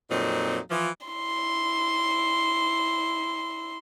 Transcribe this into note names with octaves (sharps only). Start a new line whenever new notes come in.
F2 A#2 F#3 C4 D#4
E3 F3
E4 C6